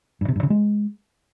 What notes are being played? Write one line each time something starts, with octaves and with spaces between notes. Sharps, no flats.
G2
C3
G2
C#3
G#3